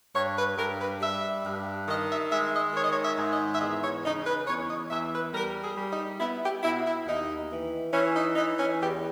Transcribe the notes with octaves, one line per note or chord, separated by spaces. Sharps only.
G2 C#5
B4
G2 A#4
B4
G3 E5
G2
D#3 D#5
E5
G#3 E5
D#5
D#3 C#5
D#5
C#5
E5
G#2
D#5
E5
E2 D#5
C#5
C#3 D#4
B4
E2 C#5
D#5
E2 E5
B4
G3 A#4
G#4
G3
D#4
B3 E4
G4
B2 E4
E4
D#2 D#4
E3
E3 C#4
D#4
E3 D#4
C#4
E2 G4